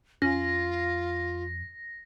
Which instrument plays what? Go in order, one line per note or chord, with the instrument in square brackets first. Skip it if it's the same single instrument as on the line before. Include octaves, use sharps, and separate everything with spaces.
[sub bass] F2 [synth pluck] C#4 [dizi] F4 [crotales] A#6